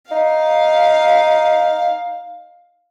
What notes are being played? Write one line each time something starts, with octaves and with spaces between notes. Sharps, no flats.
D#4 F5